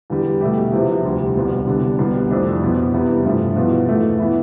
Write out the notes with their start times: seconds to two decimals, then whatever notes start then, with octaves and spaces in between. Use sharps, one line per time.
0.10 E2 D3 G3
0.41 B2 A3 E4 G4
0.73 E2 C3 F3
1.05 D2 C3 G3
1.36 C2 B2 B3
1.67 D3 G3 B3 D4
1.99 C2 B2 G3 B3
2.31 F2 E3 A3 D4
2.62 C2 B2 B3
2.94 E2 C3 G3 B3
3.25 G2 F3 A3 E4
3.56 E2 B2 B3 F4
3.89 E2 B2 A3
4.19 E3 B3 E4